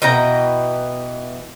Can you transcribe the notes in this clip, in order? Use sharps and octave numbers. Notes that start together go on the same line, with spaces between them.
B2 E3 G5 A#5